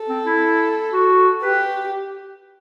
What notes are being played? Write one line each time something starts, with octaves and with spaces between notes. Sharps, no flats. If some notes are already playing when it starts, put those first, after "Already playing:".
Already playing: A4
C4
E4
F#4
G4 B4